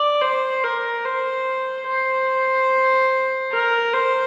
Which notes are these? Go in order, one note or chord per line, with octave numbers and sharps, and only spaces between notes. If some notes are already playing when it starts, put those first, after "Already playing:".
Already playing: D5
C5
A#4
C5
C5
A#4
C5